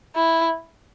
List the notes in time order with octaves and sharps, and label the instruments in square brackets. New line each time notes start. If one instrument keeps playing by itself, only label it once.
[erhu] E4